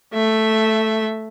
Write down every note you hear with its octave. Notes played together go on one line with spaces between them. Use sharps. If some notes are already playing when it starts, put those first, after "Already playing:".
A3 E5